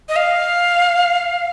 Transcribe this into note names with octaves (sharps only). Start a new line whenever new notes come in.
D#5
F5